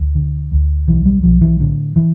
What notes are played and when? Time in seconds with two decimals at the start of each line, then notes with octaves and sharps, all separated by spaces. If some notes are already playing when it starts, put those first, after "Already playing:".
Already playing: D2
0.15 D3
0.52 D2
0.88 B1 E3
1.05 G3
1.23 B1 F3
1.42 E3
1.59 A2 D3
1.96 E3